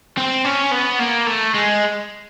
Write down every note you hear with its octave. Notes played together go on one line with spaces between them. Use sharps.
C4
C#4
B3
A#3
A3
G#3